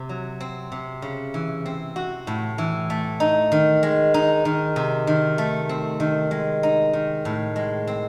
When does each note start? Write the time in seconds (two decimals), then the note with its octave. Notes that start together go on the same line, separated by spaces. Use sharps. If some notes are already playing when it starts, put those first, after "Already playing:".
Already playing: C3
0.09 F#3
0.40 C4
0.72 C3
1.02 C#3
1.34 E3
1.66 C4
1.96 F#4
2.27 A2
2.58 E3
2.90 A3
3.20 D#4
3.52 D#3
3.83 G#3
4.14 D#4
4.45 D#3
4.76 C3
5.07 D#3
5.38 A3
5.69 C4
6.00 D#3
6.31 G#3
6.63 D#4
6.93 D#3
7.25 A2
7.56 G#3
7.87 C4